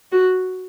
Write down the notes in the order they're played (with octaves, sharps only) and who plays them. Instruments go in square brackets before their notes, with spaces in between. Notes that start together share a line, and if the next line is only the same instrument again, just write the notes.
[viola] F#4